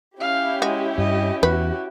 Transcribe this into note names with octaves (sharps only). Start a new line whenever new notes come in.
C#4 E4 G4 F5
G#3 F#4
G2 D#5
E2 F#4 B4